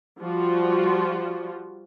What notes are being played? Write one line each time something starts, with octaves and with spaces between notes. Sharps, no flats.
F3 G3 F4 F#4